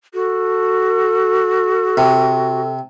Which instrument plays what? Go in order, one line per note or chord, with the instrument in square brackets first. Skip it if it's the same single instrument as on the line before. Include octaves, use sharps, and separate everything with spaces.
[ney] F#4 [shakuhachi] A4
[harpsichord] C3